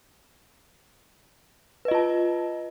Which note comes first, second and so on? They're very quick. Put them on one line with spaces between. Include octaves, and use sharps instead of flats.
B4 D#5 F4 A5